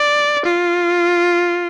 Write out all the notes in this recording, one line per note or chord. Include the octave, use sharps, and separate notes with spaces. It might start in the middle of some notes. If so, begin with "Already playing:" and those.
Already playing: D5
F4